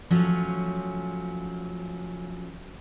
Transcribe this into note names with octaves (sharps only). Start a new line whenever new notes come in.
F3 F#3 A3 C#4